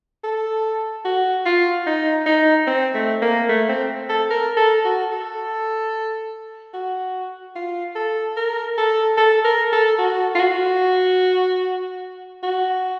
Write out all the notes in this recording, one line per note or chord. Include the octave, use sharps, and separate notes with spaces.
A4
F#4
F4
D#4
D#4
C4
A3
A#3
A3
C4
A4
A#4
A4
F#4
A4
F#4
F4
A4
A#4
A4
A4
A#4
A4
F#4
F4
F#4
F#4